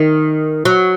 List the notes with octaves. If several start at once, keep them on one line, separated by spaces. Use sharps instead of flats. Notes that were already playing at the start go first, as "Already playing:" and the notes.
Already playing: D#3
F#3